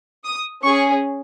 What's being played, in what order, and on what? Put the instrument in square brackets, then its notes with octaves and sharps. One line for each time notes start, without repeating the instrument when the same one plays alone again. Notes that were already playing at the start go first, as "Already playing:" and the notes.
[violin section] D#6
C#4 G#4 C#6